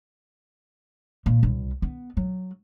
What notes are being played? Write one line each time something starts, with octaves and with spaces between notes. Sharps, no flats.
A#2
C2
B3
F#3